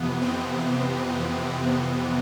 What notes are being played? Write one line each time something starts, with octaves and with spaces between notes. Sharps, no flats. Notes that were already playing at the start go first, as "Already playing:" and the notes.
Already playing: F2 C3 E3 B3
C4
C4